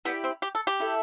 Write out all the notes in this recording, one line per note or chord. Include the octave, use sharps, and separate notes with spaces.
B3 E4 G4 D5
C4
G4
A4
G4
E4 A4 E5